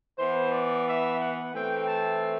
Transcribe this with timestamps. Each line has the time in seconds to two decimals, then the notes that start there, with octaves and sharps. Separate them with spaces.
0.18 E3 B3 C5
0.52 D5
0.86 E5
1.20 F#5
1.54 E3 A3 C4 G5
1.88 A5